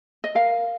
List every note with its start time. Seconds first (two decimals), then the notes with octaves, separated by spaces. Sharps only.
0.24 D#5
0.35 A#4 F5